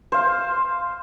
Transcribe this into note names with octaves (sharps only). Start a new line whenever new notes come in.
C5 F5